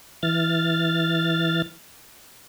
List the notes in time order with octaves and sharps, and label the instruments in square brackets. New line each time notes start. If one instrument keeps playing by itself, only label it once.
[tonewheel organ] E3 F6 A6